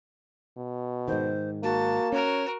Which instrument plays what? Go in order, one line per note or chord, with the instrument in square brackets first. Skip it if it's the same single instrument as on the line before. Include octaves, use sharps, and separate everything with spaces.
[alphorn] B2
[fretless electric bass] G#2 D#3 [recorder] C5
[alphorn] A#3 [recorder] F#4 [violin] A5
[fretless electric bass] C#4 [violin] F#4 A#4 [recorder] C#5